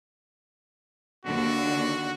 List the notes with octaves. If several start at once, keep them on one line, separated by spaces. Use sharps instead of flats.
D#2 D3 F#4